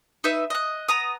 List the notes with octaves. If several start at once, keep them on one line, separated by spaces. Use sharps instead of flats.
D#4 B4 E5
D#5 F#6
B3 A#5 D#6